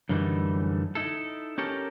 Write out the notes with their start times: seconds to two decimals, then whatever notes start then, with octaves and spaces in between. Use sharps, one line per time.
0.09 F#2 D3 E3 G3 A3 D#4
0.95 D#4 E4 A4
1.58 C#4 G4 A4 A#4